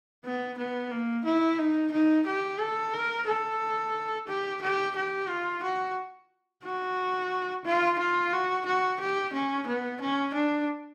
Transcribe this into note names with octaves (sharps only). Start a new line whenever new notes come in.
B3
B3
A#3
E4
D#4
D#4
G4
A4
A#4
A4
G4
G4
G4
F4
F#4
F#4
F4
F4
F#4
F#4
G4
C#4
B3
C#4
D4